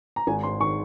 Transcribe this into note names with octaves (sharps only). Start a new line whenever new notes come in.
A#5
G#1 G#5
G#2 C6
D#3 C#6